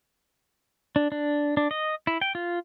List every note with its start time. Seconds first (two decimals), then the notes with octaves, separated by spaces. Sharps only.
0.96 D4
1.12 D4
1.57 D4
1.71 D#5
2.07 E4
2.22 G5
2.35 F4